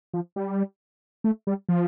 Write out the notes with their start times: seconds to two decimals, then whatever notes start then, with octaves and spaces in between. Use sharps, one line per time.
0.14 F3
0.36 G3
1.24 A3
1.47 G3
1.69 F3